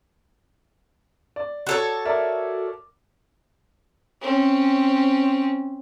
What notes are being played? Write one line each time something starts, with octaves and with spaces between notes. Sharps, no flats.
D5
F#4 A4 C#5
A#4 D5 E5
C4 C#4